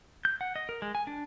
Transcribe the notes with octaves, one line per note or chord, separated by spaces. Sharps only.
G6
F#5
D#5
A#4
G#3
G#5
D4